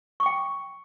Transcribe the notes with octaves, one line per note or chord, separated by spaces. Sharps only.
G5 C#6 D6